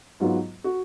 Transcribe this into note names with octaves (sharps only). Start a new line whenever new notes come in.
G#2 F#3 B3 F4
F#4